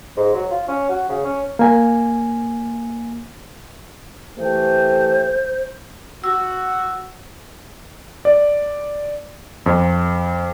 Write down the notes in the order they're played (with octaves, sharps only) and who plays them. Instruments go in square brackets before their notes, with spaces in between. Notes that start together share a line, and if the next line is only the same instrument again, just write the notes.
[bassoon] G#2
F#3
F4
C#4
F#4
C#3
C#4
[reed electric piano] A#3 G#5
[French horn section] E3 A3 G4 [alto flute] C5
[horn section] F#4 [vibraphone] E6
[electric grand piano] D5
F2